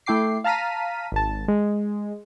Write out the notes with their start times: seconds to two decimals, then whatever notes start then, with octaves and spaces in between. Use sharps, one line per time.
0.06 A3 E4 G5 D6 C7
0.44 F5 A5 A#5 F6 B6 D#7
1.12 G#1 A5
1.48 G#3